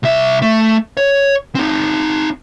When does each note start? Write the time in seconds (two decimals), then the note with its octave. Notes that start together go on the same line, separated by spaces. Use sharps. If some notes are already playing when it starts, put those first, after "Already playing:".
0.03 C2 E5
0.42 A3
0.97 C#5
1.55 C4 D#4